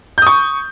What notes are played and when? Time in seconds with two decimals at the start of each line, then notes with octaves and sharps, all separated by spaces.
0.18 G6
0.22 D#6
0.27 C#6